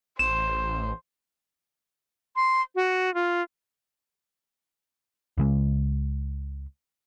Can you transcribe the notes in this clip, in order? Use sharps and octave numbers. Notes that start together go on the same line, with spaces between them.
A1 C5 E7
C6
F#4
F4
C#2 C#3 G#3